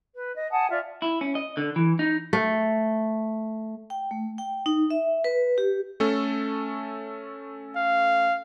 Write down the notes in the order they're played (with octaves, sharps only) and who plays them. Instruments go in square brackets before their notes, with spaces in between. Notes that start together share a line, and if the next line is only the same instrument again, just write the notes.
[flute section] B4
D#5
F#5 G#5 A5 D#6
F4 D5 E5
[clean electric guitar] E4
C#4
D#5
D3
E3
D#4
[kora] A3
[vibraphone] G5
A3
G5
D#4
E5
B4
G4
[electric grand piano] A3 C#4 A4
[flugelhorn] F5